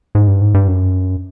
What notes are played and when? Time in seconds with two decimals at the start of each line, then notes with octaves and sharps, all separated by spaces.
0.15 G#2
0.27 G2
0.41 G#2
0.54 G2
0.68 F#2